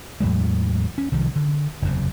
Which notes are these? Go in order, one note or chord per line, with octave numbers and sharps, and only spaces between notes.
E2 A2 F#3 G#3
C#4
C2 D#3 F3
D3
F#1 E2 C3